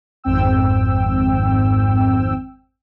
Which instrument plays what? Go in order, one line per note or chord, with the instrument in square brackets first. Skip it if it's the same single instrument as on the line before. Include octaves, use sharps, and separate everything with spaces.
[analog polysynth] G#1 F2 G#2 C4 G5 E6